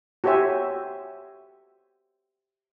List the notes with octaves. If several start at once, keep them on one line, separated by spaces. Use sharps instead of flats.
F#4 G4 C5 C#5 E5 G#5